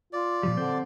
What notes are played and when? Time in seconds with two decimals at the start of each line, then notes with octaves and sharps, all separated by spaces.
0.13 F4 D5
0.43 A#2 F3 G3
0.57 D3 C4 C5